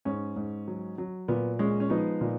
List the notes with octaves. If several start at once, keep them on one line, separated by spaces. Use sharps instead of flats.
G#2 C#4
G#2
F#3
F#3
A#2 B3
G#3 C#4
C#4
F3 B3 D#4
A#2